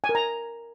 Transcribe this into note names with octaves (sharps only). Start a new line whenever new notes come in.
G#5
A#4
A#5